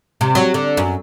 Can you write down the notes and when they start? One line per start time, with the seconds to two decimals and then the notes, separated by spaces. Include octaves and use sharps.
0.21 C3
0.35 F#3
0.54 D3
0.77 F#2